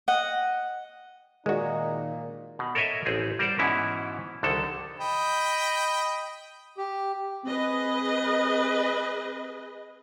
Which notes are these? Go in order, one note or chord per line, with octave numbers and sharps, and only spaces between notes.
D#5 F#5
A#2 D#3 G#3 D#4 F#4
B2
A4 A#4 C#5 D#5 E5
A1 C4 G#4
G3 A#4 C5 D5 F#5
G#2 B2 E3 C#4 E4
C2 D3 D#3 A4
D#5 G5 B5
G4
C4 G#4 B4 D#5